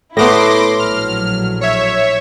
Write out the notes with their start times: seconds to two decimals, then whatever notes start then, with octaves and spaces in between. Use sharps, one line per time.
0.17 A2 A3 B3 E4 C6 D6 A#6
0.79 A#1 F#3 F6
1.61 C#5 E5